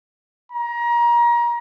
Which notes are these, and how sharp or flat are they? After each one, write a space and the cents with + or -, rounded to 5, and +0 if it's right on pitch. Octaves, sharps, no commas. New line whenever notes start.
A#5 +30